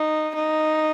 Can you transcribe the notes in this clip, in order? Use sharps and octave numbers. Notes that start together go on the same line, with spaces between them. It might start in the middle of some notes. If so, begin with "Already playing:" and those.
Already playing: D#4
D#4